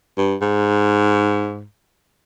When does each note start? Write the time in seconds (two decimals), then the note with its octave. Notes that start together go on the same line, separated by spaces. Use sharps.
0.18 G2
0.42 G#2